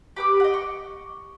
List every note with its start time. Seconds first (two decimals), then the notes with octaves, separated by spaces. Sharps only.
0.16 G4 B4 D6
0.40 D#5 F#5
0.54 C#6